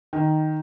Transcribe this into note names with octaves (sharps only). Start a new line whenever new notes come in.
D#3